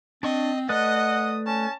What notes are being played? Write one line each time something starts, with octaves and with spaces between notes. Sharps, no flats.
C4 D4 D#5 C#6
A3 B4 D5 D#5 F#5 D#6
C#4 A5